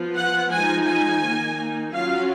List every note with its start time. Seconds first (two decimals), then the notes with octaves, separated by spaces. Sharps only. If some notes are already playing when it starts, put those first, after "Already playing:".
Already playing: F3 B3 F4
0.16 F#5
0.51 F3 G#3 D#4 G#5
0.86 G#5
1.22 D#3 A#3 D#4
1.92 F#3 C#4 F4 F5